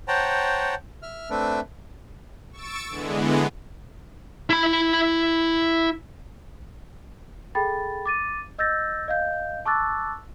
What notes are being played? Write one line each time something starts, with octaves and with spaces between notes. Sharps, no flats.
C5 C#5 F#5 G5 A5 A#5
E5 F6
A3 C4 D4 B4 E5
C#6 E6 A6 D7
D3 E3 G#3 B3
E4 B5
G#4 A4 G5 B5 A6
D6 A6 D#7
D#5 E6 G6 A6 A#6
D#5 F5 G6
A5 C#6 D6 E6 F#6 A6